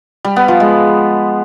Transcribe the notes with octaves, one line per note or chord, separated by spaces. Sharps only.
G3
B3
F3
G#3